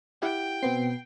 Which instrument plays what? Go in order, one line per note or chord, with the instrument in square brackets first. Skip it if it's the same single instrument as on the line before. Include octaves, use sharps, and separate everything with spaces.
[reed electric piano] E4 G4 F#5 [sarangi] G5
[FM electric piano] B2 B3 C7 [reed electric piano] C4